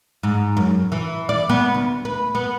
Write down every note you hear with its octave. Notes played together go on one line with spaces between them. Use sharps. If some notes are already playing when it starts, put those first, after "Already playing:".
G#2
F#2
E3
D5
B3
D2
B4
B3